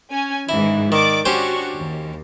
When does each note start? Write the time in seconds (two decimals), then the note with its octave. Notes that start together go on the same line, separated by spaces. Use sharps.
0.11 C#4 G#5
0.49 G#2 D#3 E3 E4
0.92 D#3 D5 D6
1.25 C#4 D4 F#4 G4 C5 C#6
1.76 D#2